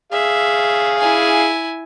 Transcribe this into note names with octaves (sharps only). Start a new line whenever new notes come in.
G#4 E5 F5
E4 G#5